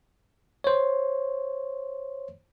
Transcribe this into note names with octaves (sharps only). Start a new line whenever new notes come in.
C5 C#5